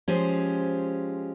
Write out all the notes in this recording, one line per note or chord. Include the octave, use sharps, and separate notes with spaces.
F3 G#3 C#4 G4 C5